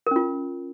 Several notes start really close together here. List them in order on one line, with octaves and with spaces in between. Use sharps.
A#4 C#4 F4